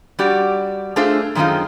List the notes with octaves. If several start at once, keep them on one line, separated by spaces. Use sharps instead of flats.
G3 F#4 G4 D5
A3 D4 F4 G#4 A4 C5
F#2 D#3 G#3 C4 D#4 F4